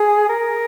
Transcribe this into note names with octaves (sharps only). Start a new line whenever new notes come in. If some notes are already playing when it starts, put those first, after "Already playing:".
Already playing: G#4
A#4